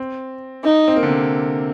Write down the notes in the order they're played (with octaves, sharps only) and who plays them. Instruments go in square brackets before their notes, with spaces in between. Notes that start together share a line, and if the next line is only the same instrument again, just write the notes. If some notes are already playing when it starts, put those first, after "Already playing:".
Already playing: [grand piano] C4
[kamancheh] D#4
[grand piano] C4
A#3
D3
C3